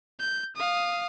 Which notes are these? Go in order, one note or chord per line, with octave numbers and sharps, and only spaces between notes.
G6
F5 D#6